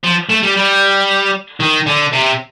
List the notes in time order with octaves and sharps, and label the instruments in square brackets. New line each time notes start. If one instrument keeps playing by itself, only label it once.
[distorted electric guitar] F3
A3
G3
G3
D#3
D3
C3